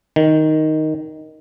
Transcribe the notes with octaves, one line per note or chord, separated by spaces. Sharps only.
D#3